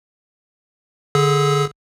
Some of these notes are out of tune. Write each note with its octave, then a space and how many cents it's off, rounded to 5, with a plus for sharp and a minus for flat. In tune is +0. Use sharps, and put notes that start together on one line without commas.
D3 +0 G#4 +5 E6 -25